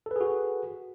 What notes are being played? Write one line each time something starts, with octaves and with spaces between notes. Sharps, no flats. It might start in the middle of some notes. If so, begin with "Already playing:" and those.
F#4 G#4 A4 B4